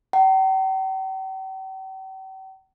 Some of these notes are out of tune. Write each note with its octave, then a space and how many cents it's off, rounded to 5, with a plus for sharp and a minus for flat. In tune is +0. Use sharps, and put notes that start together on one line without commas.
G5 -45 A#5 -35